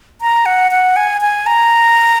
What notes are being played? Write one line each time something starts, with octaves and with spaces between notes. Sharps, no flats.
A#5
F#5
F#5
G#5
G#5
A#5